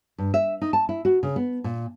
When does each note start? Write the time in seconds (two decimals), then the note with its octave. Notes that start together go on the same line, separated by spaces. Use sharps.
0.18 G2
0.34 E5
0.61 D#4
0.73 A5
0.89 E4
1.05 F#4
1.23 C#3
1.36 B3
1.64 A#2